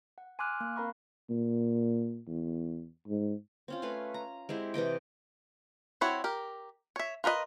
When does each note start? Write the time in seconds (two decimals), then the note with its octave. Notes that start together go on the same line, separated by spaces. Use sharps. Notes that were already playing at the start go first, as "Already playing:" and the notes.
0.18 F#5
0.39 G#5 C6 D6 F6 F#6
0.61 A#3 F#6
0.76 C4 A#4 F5 A#5 B5 C#6
1.30 A#2
2.28 E2
3.08 G#2
3.68 C4 C#4 F4
3.82 A3 B4 F5 G#5
4.14 A#5
4.49 G#3 C4 E4 G4
4.74 C3 E3 D#5 G5
6.01 C4 E4 F#4 C#5
6.24 G4 A#4
6.96 C#5 E5
7.24 F4 A#4 B4 D#5